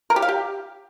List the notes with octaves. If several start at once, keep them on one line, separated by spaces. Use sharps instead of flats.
A#4
G4
F5
G4